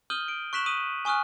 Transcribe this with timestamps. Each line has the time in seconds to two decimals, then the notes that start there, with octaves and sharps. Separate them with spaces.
0.10 D#6 F6 G6 D#7 F#7 G7
0.28 D7
0.53 C#6 F#6 B6 E7 F#7
0.66 D#6 D#7 F#7
1.05 G#5 C#6 D#6 F6 F#6